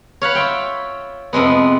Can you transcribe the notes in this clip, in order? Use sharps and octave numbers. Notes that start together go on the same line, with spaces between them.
C#5 F5 F#5 B5
F4 E5 G5
F2 C3 G#3 B3